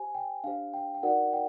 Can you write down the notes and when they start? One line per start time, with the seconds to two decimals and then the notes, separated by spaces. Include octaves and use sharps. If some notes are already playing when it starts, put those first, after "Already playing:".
Already playing: G4 C5 G#5
0.15 G5
0.44 D4 G4 C5 F5
0.74 G5
0.94 G5
1.03 D#4 F#4 A#4 D5 F#5
1.33 G5